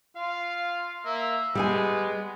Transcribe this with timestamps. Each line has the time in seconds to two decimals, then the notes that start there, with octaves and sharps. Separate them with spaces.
0.17 F4 F5
1.05 A#3 E5
1.55 G3 G#3 B3 G#4 G#5